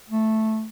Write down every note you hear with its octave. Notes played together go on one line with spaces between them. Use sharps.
A3